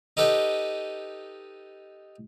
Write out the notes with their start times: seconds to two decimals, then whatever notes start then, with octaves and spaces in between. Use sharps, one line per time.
0.17 D#4 G4 A4 B4 D#5